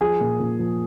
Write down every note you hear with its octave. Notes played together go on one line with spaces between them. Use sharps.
F3 G#4
A#2
A#2
F3